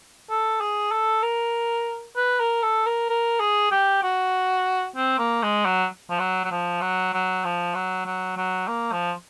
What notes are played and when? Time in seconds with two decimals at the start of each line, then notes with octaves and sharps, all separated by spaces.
0.30 A4
0.61 G#4
0.92 A4
1.23 A#4
2.16 B4
2.40 A#4
2.63 A4
2.86 A#4
3.10 A#4
3.40 G#4
3.72 G4
4.03 F#4
4.96 C4
5.19 A#3
5.43 G#3
5.65 F#3
6.10 F3
6.19 F#3
6.44 F#3
6.51 F3
6.81 F#3
7.14 F#3
7.45 F3
7.75 F#3
8.06 F#3
8.37 F#3
8.68 A#3
8.92 F3